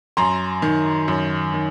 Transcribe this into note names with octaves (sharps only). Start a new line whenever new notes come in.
F#2 A#5 C6
D#3
F#2
D#3